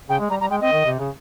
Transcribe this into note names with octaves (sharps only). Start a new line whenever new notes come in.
C#3 G5
G#3
G3 A#5
G3 A#5
G#3 G5
C4 D#5
D#3
C3
C#3